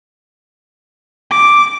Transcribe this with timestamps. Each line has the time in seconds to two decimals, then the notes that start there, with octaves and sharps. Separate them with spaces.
1.30 D6